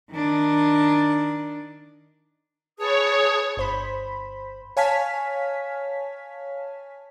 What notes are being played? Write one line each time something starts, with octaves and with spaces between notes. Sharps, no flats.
D#3 D4
G#4 B4 C#5 A5 D#6
G1 C5 B5
C#5 F5 G#5 A5 F6 B6